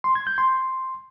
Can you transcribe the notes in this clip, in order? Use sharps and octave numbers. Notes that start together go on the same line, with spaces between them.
C6
G#6
G6
C6